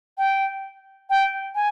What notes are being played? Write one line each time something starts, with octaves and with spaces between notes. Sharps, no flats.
G5
G5
G#5